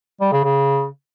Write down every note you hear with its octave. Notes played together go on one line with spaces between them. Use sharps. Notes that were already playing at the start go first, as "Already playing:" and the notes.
G3
C#3
C#3